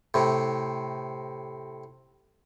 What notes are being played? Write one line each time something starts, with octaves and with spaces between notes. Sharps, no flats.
A2 C3